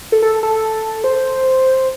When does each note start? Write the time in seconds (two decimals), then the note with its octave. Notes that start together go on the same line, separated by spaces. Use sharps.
0.12 A4
0.22 A4
0.43 A4
1.04 C5